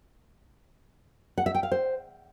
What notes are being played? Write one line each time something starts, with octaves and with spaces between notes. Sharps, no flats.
F#5
E5
G5
F5
C5